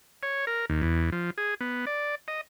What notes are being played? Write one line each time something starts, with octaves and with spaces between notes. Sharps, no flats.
C#5
A#4
D#2
E2
F3
G#4
B3
D5
D#5